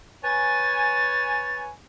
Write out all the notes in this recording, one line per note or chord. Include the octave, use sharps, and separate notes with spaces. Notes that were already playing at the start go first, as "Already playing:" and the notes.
B4 C#5 G#5 A6